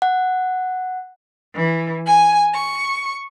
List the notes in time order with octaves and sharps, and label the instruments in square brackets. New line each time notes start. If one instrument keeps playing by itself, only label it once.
[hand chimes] F#5
[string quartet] E3
G#5
C#6